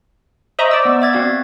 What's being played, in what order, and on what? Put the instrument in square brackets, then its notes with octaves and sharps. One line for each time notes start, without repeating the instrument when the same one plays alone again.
[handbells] C5 C#6 [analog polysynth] D#5 E5 A#5
[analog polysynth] D5 E6
[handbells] B3
E5 G#6 A6
C4 F#4 F5